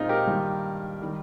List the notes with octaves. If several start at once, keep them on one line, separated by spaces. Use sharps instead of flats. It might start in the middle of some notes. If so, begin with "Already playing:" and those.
Already playing: A#2 G#3 C4 D#4 F4
G4 A#4
G2 D#3 A#3
D#3 G3